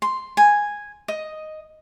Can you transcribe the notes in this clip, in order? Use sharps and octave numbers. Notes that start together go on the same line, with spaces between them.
C6
G#5
D#5